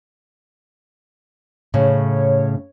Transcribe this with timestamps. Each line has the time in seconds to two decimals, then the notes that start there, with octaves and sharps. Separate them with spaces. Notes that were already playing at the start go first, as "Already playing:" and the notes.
1.74 A2 C#3 C#5